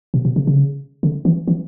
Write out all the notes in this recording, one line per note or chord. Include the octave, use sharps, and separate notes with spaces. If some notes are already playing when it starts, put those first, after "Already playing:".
B2
B2
C#3
C#3
D3
E3
E3